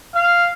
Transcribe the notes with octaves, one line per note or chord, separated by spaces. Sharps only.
F5